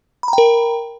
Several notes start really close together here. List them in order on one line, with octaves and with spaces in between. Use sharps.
B5 A#5 G5 A#4